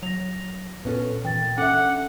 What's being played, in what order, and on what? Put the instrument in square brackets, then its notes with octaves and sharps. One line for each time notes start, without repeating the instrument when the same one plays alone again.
[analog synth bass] F#3 [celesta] A#6 F7
[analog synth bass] A#2 [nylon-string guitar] B3 C#4 A4
[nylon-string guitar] A#2 [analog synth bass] E3 [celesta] G5 A6
[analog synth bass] C#4 [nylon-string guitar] D4 E5 [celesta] A4 D6 C#7 [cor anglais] F#5